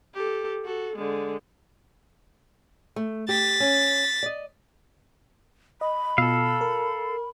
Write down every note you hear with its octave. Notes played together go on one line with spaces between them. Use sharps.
G4 A4
F#4 A4
D3 G#3
A3
G4 A6 B6
C#4
D5 D#5
D#5 B5
B2 F4 A4 F5 E6
A#4